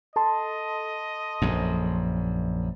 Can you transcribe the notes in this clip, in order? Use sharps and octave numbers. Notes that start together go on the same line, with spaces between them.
A4 D#5 A5 C6
A#1 F#2